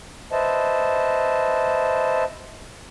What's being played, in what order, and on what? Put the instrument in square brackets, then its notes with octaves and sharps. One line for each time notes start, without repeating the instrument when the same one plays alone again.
[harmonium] B4 C5 D#5 E5 A5